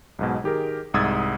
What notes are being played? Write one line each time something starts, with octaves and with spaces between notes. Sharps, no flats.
B1 G#2 B2
D#3 G4 G#4 A#4
C2 G#2 D#6 E6 G#6 A6